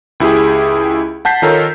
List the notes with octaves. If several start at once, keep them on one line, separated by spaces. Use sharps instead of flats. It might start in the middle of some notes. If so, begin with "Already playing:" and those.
C#2 E4 G4 G#4
F#5 A5 G6 B6 C7
D#3 D#4 F4 A4 A#4 C#5